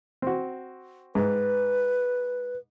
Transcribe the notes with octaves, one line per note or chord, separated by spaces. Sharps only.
C4 F#4
G#2 B4